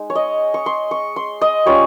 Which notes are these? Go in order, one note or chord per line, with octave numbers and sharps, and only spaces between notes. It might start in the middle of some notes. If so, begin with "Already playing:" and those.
Already playing: G#3 D#4
C#5
D#5
C#6
C6
C#6
C6
D#5
G3 C#4 F4 C#5